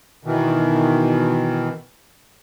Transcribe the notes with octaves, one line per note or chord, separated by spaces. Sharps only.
B2 D#3 E3